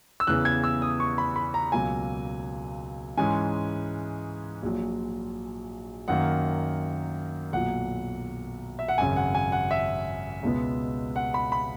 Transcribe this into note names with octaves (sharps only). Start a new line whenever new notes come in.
E6
E2 C#3 E3 B3 F#6
G#6
E6
D#6
C#6
B5
B5
A#5
C#2 B2 F#3 A#3 G#5
G#2 E3 G#3 C#4 G#5
A#1 A#2 F#3
F#2 D#3 A#3 F#5
B1 A#2 F#3 F#5
E5
F#5
G#1 F#2 C#3 G#5
F#5
G#5
F#5
E5
C#2 B2 G#3 B3
F#5
B5
B5